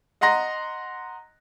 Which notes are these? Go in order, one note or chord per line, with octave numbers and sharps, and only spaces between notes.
D#5 F#5 A#5 C6 A#6